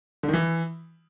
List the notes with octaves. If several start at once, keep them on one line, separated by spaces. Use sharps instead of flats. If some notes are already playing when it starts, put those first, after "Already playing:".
D3
D#3
E3